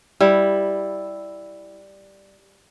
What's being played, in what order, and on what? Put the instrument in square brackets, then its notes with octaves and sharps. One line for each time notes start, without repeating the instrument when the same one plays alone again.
[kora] G3 E4